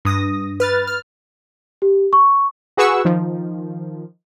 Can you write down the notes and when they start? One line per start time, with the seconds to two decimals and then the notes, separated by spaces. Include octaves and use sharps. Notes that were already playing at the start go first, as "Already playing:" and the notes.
0.05 G2 D#6 A#6
0.60 B4 F6 A6
0.87 F6
1.82 G4
2.13 C#6
2.77 F#4 G#4 B4 F#5 C#6 E6
3.05 D#3 F3